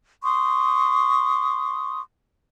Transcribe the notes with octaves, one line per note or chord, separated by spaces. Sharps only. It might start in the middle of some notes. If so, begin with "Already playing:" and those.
C6 C#6 D#6